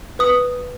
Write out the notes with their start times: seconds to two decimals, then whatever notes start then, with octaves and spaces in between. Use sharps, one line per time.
0.19 B4 D#6